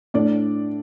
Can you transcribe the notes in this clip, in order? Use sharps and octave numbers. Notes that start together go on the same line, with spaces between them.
A2 D4 D5